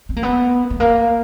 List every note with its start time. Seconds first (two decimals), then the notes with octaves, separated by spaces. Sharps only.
0.09 C4
0.16 A#3
0.23 B3
0.70 A3
0.80 A#3